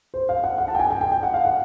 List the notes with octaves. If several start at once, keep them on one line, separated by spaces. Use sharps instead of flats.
C5
F5
F#5
F#5
A5
G5
G#5
G5
G5
G5
F#5
F5
F#5